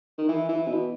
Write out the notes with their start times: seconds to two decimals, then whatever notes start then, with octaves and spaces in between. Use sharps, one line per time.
0.18 D#3
0.29 E3
0.49 E3
0.67 B2